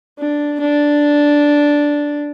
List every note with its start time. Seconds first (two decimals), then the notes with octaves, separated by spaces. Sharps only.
0.19 D4
0.60 D4